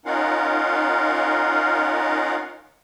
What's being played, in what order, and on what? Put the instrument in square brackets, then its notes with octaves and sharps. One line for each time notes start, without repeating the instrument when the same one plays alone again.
[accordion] C#4 D#4 F4 A#4 F5 F#5